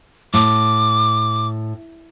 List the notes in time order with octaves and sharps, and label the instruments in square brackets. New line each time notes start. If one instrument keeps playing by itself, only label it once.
[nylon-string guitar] A2 [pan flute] D6